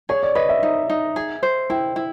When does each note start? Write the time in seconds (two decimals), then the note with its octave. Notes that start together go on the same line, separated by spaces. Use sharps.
0.09 G#4 C#5
0.23 D5
0.35 B4 D#5
0.49 E5
0.63 D#4
0.90 D#4
1.16 G#4
1.43 C5
1.70 E4 G5
1.96 E4